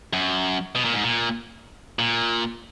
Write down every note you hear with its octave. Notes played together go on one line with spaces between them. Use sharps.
F#2
B2
A#2
G#2
A#2
A#2